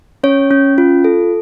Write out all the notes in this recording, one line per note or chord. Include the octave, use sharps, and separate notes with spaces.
C#4 C#5
C#4
F4
A4